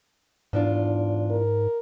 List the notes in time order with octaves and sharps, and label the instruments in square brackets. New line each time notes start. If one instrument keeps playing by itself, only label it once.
[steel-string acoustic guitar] E2 D4 F4 [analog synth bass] G#2
[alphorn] A#4